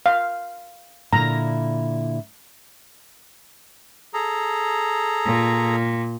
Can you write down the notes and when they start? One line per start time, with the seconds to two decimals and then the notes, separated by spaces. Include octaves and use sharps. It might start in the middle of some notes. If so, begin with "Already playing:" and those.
0.06 F5
1.13 A#2 D3 E4 A#5
4.14 G#4 A4 A#5
5.25 A#2